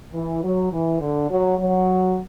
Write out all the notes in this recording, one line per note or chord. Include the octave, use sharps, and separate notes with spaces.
E3
F#3
E3
D3
F#3
F#3